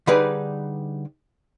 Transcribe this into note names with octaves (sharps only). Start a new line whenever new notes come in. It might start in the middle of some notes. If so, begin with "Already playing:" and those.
D3 G3 D#4 G#4 B4 D5